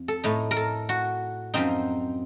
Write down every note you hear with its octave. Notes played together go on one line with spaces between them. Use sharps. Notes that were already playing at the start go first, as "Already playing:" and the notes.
Already playing: F2
A4
A2 A3 D#4
A#4
A4
F#4
F#2 F3 C4 D#4